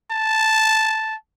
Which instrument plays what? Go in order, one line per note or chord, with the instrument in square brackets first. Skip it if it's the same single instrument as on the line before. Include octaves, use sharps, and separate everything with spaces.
[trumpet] A5